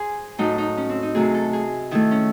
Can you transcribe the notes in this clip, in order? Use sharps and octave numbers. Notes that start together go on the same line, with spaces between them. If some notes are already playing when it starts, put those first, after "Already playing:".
Already playing: G#4 C5
A2 F#3 A3 D#4
D#4
C#4
C4
D#4
C3 F#3 A3 G#4
A4
G#4
D#3 A3 E4
C#4